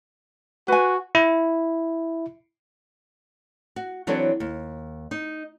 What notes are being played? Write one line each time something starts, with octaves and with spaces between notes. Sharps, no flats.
F#4 B4 G#5
E4
F#4
E3 F#3 C4 D4 A4 C#5
D#2
D#4